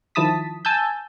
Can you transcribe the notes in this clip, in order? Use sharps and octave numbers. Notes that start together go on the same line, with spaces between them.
D#3 F3 E4 A5 D#6 B6
G#5 A5 E6 G6